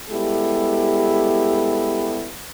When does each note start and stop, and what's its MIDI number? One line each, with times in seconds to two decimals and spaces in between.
0.10 2.28 55
0.10 2.28 56
0.10 2.28 59
0.10 2.28 64
0.10 2.28 67
0.10 2.28 69